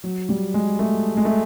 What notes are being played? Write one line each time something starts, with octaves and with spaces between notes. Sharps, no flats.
F#3
G3
G#3
A3
G#3
A3